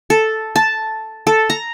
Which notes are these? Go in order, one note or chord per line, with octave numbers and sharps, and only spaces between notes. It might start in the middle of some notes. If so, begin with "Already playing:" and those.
A4
A5
A4
A#5